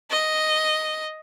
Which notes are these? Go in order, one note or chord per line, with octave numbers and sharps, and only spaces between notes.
D#5